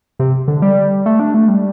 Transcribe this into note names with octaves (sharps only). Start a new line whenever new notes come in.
C3
D3
G3
A3
D4
A3
G3